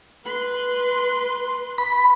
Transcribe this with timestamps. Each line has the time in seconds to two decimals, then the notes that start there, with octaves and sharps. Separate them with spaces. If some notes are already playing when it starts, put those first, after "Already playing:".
0.24 B4 C6
1.78 B5